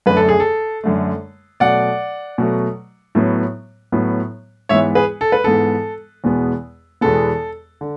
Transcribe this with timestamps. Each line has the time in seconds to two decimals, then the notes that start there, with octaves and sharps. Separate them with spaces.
0.06 F#2 D3 A3 B4
0.17 A4
0.29 G#4
0.40 A4
0.84 F#2 D3 A3
1.60 B2 F#3 A3 D5 F#5
2.38 B2 F#3 A3
3.15 A2 F#3 B3
3.92 A2 F#3 B3
4.69 G#2 E3 B3 C#5 E5
4.95 G#4 B4
5.21 A4
5.32 B4
5.44 G#2 E3 B3 A4
6.24 E2 B2 G#3 B3
7.01 E2 B2 G#3 B3 A4
7.81 D3